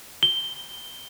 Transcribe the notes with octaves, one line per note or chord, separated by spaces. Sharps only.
G7